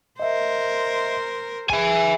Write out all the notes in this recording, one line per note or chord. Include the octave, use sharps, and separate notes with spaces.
A#4 C5 D#5 E5
B1 G#4 E5 G#5